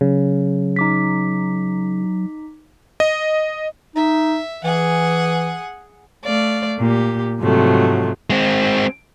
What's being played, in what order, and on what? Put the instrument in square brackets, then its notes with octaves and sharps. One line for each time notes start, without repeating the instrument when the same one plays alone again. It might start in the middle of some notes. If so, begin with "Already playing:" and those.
[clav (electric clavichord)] C#3 [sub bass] F#3
[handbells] D#4 D6 B6
[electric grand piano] D#5
[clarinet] D#4 [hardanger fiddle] E5
[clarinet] E3 [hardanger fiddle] G#4 F#5
[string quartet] A3 D5 F5
A#2 G4
G#2 C3 F3 F#3 A3
[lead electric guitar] G#3 C4